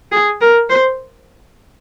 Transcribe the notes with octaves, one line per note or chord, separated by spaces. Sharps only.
G#4
A#4
C5